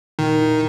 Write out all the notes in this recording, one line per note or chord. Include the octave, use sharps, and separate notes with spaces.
A#2 D#3
E4